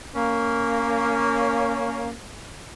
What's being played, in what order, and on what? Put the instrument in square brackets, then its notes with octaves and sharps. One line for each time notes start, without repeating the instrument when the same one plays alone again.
[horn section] A#3 C#4